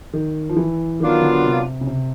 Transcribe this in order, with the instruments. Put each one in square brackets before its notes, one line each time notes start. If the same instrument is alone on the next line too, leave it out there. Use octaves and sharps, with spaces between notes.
[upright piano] D#3
F3
E3
[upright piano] D#3 [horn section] F#3 B3 D4 F4 A#4
[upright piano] D3
C3
C#3
C3